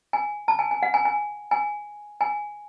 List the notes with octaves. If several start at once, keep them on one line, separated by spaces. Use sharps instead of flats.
G#5
A5
G#5
G#5
F#5
G#5
G#5
G#5
G#5